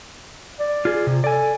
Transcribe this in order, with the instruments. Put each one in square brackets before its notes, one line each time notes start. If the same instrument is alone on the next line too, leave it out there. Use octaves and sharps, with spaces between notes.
[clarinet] D5
[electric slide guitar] F4 G#4
C3
[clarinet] A4 [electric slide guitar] D5 G#5